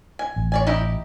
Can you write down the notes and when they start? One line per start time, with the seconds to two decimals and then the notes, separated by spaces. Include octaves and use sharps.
0.19 G#5
0.36 A1
0.52 C#5 D5 G#5
0.67 D#4 E4 G4